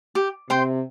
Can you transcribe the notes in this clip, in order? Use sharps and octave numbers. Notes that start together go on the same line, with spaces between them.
G4
C3 C5 G5 C6